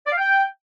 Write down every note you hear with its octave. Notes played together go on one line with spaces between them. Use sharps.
D5
F5
G5